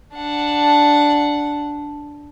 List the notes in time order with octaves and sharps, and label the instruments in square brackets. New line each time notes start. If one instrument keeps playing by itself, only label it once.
[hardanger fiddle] D4 F#5